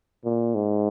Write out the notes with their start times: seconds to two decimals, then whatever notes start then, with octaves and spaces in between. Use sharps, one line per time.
0.25 A#2
0.55 G#2